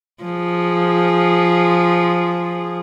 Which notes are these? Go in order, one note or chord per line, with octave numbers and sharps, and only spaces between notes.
F3 G#4